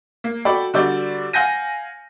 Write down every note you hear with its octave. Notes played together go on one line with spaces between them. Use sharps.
A#3
F#4 A4 D5 G5 B5
D3 G3 F#4 D5 G6
F5 F#5 G#5 G6 A#6 D#7